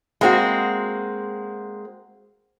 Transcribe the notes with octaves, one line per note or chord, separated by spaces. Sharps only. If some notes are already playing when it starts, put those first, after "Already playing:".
G#3 A#3 C4 E4 F#4